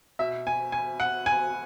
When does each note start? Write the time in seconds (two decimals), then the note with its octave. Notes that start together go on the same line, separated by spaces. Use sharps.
0.19 B2 E5
0.47 G#5
0.72 G#5
1.00 F#5
1.26 G#5